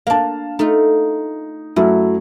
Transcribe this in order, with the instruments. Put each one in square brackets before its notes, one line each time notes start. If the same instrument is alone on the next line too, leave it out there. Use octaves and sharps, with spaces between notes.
[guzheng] A#3 D4 [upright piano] F5 A5
[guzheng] A3 F4 [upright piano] D#4
[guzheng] F#2 [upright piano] F#3 A3 E4